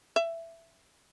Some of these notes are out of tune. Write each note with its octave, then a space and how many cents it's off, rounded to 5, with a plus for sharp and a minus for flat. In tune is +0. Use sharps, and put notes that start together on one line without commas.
E5 +10